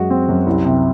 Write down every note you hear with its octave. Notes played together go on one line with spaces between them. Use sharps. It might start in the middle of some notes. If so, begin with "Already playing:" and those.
Already playing: F#2 G#3 F#4
C4
F#2
C2
C3